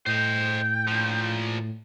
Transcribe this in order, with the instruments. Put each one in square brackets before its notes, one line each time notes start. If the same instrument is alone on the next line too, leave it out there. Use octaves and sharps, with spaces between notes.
[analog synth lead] A2 [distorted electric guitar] C5 D#5 [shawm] G5
[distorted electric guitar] A#2 F3